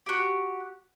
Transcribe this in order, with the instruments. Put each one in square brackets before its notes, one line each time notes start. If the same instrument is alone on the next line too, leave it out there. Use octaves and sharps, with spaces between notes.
[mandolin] F#4 G4